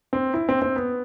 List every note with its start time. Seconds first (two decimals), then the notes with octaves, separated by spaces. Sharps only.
0.13 C4
0.34 E4
0.49 C4
0.62 C4
0.76 B3